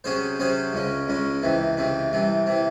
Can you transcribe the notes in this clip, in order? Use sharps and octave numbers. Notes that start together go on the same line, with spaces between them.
C3 F#3 C#4 G#4 C5
C3 F#3 C#4 G#4 C5
C#2 C#3 G#3 C#4
C#2 C#3 G#3 C#4
C#2 C3 E3 C4
C#2 C3 E3 C4
C2 C3 E3 C4
C3 E3 C4